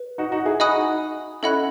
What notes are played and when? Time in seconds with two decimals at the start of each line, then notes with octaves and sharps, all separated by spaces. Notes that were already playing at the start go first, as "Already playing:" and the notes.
Already playing: B4
0.18 D#4 F#4
0.32 D#4 F#4
0.46 E4 G#4
0.60 D#4 F#4 D#5 G#5 B5 D#6 F#6
1.43 C#4 E4 A4 D#5 F#5 B5 F#6